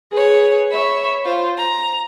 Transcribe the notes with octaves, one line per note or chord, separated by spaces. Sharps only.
G#4 B4 C#5
C#5 E5 B5
F4 C5
A#5